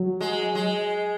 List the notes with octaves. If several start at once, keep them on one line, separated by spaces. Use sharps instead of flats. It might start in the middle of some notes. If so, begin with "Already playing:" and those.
Already playing: F#3
G#3
G#3